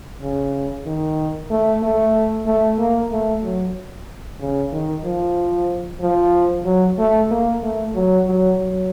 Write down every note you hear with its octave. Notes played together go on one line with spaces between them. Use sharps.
C#3
D#3
A3
A3
A3
A#3
A3
F#3
C#3
D#3
F3
F3
F#3
A3
A#3
A3
F#3
F#3
F#3